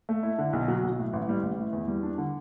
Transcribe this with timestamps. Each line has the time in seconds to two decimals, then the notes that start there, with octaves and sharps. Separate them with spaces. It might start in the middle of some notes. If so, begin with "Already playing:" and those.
0.09 A3
0.23 E4
0.38 D3
0.53 B1
0.68 F#3
0.83 B1
0.98 A2
1.13 A1
1.29 G3
1.43 A1
1.58 A2
1.73 E2
1.88 G3
2.03 D4
2.18 D3